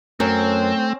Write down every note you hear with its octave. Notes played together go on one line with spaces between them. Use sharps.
F#2 A3 C4 C#4